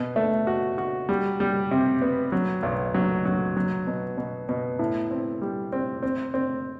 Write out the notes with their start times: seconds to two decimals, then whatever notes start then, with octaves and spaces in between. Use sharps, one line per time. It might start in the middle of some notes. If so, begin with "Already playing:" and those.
Already playing: B2
0.16 A3
0.47 F#4
0.78 F#4
1.09 G3
1.40 G3
1.71 C3
2.02 B3
2.32 F#3
2.63 B1
2.94 F#3
3.25 F#3
3.57 F#3
3.87 B2
4.18 B2
4.49 B2
4.79 A2
5.11 C4
5.41 G3
5.72 C4
6.03 C4
6.34 C4